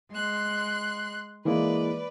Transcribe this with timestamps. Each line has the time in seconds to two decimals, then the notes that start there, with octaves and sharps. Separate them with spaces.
0.11 G#3 C6 F#6
1.45 E3 G#3 A#3 B4 D5